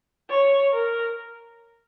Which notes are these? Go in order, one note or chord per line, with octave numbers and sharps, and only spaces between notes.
C#5
A#4